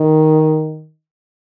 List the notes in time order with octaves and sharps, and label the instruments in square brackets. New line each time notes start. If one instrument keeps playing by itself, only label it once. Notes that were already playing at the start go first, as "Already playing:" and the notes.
Already playing: [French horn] D#3